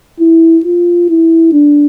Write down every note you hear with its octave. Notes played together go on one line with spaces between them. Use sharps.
E4
F4
E4
D4